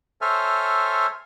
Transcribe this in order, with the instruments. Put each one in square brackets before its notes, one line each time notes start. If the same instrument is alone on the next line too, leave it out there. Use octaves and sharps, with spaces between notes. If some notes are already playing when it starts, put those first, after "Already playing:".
[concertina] A4 C5 C#5 E5 G#5 F6